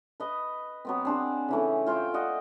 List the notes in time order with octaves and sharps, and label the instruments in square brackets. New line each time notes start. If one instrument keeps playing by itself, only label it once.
[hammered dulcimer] B4 D#5
F#3 B3 C4
C4 D4 G#4
C#3 E3 A3
F4 C5 F5 G5
D5 D#5 F#5 G#5